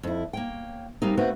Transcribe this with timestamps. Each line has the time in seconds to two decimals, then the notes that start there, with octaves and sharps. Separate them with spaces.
0.03 F2 E4
0.33 A#3 C#5 G5
1.02 G3 G#3 A#3 C4 D#4
1.17 A3 A#3 C4 F#4 B4 C5